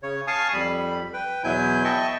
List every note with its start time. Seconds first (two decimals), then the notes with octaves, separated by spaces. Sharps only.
0.03 C#3 C#5
0.27 F5 G#5 A5 C#6 D#6
0.53 F2 G3 B5
1.13 B4 G5
1.44 E2 B2 F#3 E4 G#5 G6
1.84 D#5 E5 G5 A5 C#6